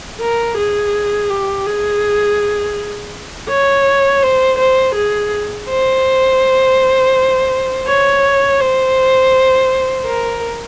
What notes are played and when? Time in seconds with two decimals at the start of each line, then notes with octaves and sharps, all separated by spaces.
0.21 A#4
0.58 G#4
1.30 G4
1.67 G#4
3.50 C#5
4.23 C5
4.59 C5
4.95 G#4
5.69 C5
7.87 C#5
8.60 C5
10.06 A#4